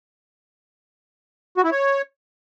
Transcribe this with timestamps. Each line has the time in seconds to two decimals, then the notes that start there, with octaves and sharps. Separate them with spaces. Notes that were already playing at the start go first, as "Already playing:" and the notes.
1.57 F#4
1.64 E4
1.71 C#5